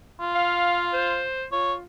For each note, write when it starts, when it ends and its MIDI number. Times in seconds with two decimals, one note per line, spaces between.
0.20 1.22 65
0.35 0.85 77
0.93 1.46 72
1.52 1.83 65
1.52 1.73 73